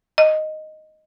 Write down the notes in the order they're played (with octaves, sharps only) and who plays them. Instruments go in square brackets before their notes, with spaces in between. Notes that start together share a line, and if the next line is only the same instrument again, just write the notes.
[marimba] D#5